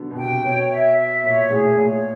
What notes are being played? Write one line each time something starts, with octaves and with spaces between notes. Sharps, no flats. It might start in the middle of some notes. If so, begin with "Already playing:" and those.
Already playing: D3 F#3 B3
B2
C3 G5
B2 C#5
E5
E5
A#2 C#5
A2 G#4
A#2
A2 C#5